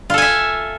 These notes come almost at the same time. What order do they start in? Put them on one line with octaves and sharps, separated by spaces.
F4 A4 G#5 E5